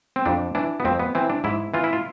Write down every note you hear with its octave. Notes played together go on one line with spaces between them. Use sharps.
C4
F2 D4
E3 D4
B3
F2 C4
B3
E3 C4
D4
G#2 E4
E3 F4
E4
F4